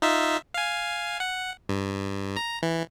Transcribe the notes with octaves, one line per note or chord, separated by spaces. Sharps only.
D#4 F4 E5
F5 G#5
F#5
G2
A#5
E3